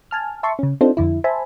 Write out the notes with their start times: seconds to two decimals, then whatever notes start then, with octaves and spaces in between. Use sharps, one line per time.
0.11 G#5 A5 F6
0.43 E5 A5 C6 C#6
0.59 C#3 C#4
0.81 C4 D4 D#4 F4 A4 C5
0.97 F2 D3 E4
1.24 C5 E5 G#5 A5 B5